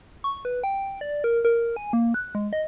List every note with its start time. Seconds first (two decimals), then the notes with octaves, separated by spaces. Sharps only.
0.24 C#6
0.45 B4
0.64 G5
1.01 D5
1.24 A#4
1.45 A#4
1.76 G#5
1.93 A#3
2.14 F#6
2.35 G#3
2.53 D#5